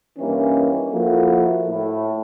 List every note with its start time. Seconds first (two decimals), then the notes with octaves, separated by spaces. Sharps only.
0.18 G2 D#3 E3 A#3 C#4
0.92 F3 A#3 E4 F#4 A4
1.67 A2